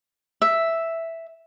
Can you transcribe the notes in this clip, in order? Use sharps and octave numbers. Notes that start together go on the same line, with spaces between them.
E5